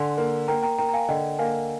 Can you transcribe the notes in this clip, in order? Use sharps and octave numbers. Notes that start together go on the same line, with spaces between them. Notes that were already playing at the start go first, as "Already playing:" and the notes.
Already playing: D3 G#5 C6
A#3
A#3 G5 A#5
G5 A#5
A#3 G5 A#5
A#5
F5 G#5
D3 D#5 G5
A#3 F5 G#5